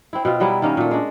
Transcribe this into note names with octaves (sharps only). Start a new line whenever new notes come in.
C4 E4
B2 C4 F4
F#3 G3 B3 E4
D#3 A#3 C#4
A#2 A3
G#3 D4